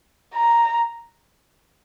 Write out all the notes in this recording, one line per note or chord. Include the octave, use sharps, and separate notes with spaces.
A#5